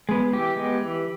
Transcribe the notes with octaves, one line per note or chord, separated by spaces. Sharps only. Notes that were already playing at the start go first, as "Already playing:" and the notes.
G#3 B3
E3 G4
G#3 B3
E3